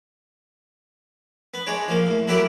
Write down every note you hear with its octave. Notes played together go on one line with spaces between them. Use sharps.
B3
G#3 D4 C#5
F3 A#3
A2
F#3 E4 G4 A4 A#4 D5